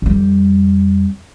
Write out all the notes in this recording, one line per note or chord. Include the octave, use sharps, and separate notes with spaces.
F2 G3